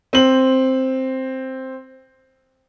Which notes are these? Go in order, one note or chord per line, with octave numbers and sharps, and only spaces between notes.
C4 F#7